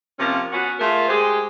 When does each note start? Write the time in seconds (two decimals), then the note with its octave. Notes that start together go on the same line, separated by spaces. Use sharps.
0.19 C3 F3 A#3 C#4
0.53 B3 C#4 F#4
0.80 A3 F4 G#4 A#4
1.09 G#3 G4 G#4 C5